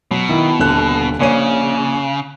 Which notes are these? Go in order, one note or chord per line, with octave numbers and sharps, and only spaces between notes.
B2 F#3
D#3 E4
D#1 D3 F#6
A#1 C#3 C#5 D#7